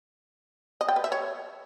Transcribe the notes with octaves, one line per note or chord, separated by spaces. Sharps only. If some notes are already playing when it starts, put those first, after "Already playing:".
D#5
G5
B4
E5
C#5